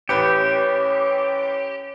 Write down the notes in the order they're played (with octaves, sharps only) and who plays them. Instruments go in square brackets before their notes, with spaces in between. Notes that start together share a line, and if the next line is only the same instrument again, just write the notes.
[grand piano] A1 B4 C#7 [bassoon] C#4 [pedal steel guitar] G4